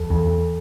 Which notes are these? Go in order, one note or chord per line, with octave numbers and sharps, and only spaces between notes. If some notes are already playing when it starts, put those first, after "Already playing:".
Already playing: E2 A4
E2